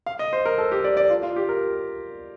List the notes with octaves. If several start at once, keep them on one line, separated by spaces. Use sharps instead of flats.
F5
D#5
C5
A#4
A4
G4
D5
D5
F4
F4
G4
A#4